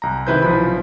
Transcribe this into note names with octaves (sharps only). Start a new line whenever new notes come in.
C2 A#5
C3 D#3 E4 B4 C5 G6
B1 F3 B5